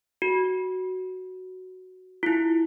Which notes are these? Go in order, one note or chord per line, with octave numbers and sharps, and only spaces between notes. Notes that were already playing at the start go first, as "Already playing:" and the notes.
F#4
E4 F4